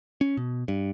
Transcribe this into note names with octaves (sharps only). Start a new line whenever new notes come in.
C#4
B2
G2